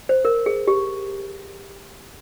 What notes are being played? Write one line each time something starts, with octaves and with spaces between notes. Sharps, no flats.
C5
A#4
G#4
G4